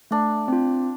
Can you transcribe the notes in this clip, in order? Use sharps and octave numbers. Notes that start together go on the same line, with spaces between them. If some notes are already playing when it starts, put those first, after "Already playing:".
A3 D4
C4 F4